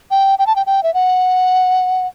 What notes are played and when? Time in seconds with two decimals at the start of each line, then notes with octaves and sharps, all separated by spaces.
0.11 G5
0.39 G5
0.47 A5
0.56 G5
0.66 G5
0.83 E5
0.94 F#5